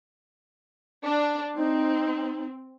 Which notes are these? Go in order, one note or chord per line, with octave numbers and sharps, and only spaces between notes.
D4
C4 D#4